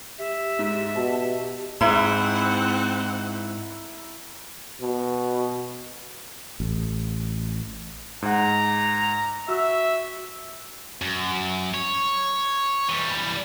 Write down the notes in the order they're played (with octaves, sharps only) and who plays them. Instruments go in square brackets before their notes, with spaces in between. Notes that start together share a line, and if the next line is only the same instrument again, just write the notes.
[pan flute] G4 [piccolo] E5
[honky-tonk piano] G#2
[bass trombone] B2 [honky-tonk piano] A5
[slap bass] G#2 [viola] C4 F#5 [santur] E4 [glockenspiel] A#5
[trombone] B2
[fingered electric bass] A1
[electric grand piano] G#2 F#5 [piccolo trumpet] A#5
[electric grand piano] F#4 E6 [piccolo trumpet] E5
[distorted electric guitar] F#2
C#5
E3 G3